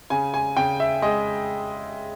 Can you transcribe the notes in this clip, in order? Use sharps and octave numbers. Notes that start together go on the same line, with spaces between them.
C#3 G#5
G#5
C#3 G5
E5
G#3 D#5